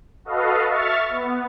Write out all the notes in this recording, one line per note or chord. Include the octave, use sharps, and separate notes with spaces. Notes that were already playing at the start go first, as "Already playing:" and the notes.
F#4 A4 B4 D#5 F5
E5 C#6 F6 A6
B3